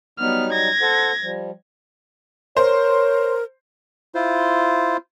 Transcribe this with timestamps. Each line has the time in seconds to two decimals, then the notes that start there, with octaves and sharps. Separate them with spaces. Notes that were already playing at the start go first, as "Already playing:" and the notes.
0.19 F#3 G3 B3 D#4 F6
0.53 G#6 A#6
0.82 A4 C5 F#5
1.22 F3 G3
2.57 A#4 C5 C#5
4.15 E4 F4 C5